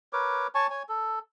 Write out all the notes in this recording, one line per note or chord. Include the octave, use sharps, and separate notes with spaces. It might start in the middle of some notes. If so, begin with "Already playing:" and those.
A#4 B4 C#5 D6
C#5 G#5 A5 C#6
C#5 G#5
A4